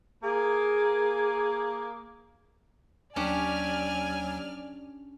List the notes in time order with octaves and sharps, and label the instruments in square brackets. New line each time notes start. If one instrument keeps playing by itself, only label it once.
[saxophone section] A#3 G#4
[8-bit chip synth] D#2 F#3 [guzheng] C#4 D4 G4 [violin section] D5 F6 [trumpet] G#5